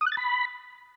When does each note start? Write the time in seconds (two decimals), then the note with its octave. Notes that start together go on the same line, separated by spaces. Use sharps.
0.01 D#6
0.06 F#6
0.12 A6
0.17 B5